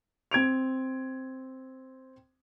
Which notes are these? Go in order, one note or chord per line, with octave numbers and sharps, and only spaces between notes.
C4 G#6 D7 F7